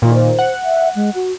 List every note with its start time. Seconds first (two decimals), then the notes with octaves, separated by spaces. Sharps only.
0.02 A#2 D#3 F4
0.14 C5
0.39 F#5
0.64 E5
0.96 G#3
1.15 F#4